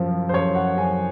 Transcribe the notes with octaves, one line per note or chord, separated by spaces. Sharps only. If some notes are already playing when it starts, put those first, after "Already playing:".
Already playing: F#2 F3
C5
F#2 C#5
F#5
F#2 G#5